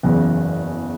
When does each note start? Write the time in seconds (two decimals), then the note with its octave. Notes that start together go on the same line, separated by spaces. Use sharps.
0.03 F#1 E2 C#3